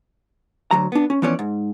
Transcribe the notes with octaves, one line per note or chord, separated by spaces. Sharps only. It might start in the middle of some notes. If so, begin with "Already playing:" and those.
D2 F#3 A#5
B3 D4
C#4
E3 F3 B3 C#4 C#5 D5
G#2